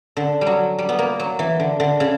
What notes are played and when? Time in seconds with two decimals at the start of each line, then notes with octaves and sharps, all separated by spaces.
0.17 D3
0.41 G3
0.47 F#3
0.79 G3
0.89 B3
0.99 A#3
1.19 F#3
1.39 E3
1.60 D3
1.80 D3
2.00 C#3